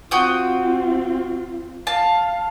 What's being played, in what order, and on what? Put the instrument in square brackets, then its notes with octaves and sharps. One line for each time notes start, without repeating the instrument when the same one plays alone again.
[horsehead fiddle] C4 F4 [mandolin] F#4 G5 D#6
[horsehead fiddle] F5 [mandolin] A5